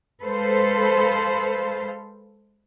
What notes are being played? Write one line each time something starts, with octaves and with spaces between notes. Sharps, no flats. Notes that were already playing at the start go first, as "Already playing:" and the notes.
G#3 A4 B4 C5 F5